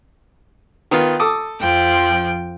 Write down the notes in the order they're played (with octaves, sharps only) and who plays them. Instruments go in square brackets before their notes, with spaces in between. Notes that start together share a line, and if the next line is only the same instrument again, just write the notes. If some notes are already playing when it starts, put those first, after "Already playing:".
[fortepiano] D#3 B3 F4
A4 D6 D#6
[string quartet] F2 F3 G5